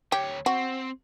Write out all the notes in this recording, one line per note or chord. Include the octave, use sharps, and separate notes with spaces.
D2 G4 C#5
C4 F#4